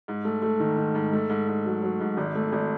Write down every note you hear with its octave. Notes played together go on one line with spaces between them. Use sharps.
G#2
A3
A3
D#3
D#3
G#2
A3
G#2
G#2
F#3
F#3
G#2
G#1
A3
G#1